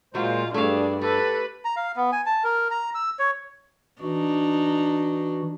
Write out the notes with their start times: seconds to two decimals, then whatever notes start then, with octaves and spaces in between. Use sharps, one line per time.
0.15 A#2 F#3 G#3 F4 A#4 C5
0.54 G2 G3 A3 D4 G#4 F5
1.01 G4 A4 B4
1.65 A#5
1.76 F5
1.96 B3
2.12 G#5
2.26 A5
2.44 A#4
2.71 A#5
2.95 E6
3.19 C#5
4.02 E3 D4 D#4 F#4